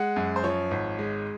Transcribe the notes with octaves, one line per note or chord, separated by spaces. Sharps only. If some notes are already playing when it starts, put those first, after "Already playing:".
Already playing: G#3 F#5
F#2
C5
F3 C#5
G#1
G#3